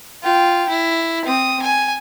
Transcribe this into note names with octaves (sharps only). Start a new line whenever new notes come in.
F4 G5
E4
C4 D#6
G#5